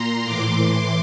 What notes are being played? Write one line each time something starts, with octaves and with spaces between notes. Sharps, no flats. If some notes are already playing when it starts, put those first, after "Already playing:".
Already playing: A#2 A#5 C6
A2 E3 C6 D6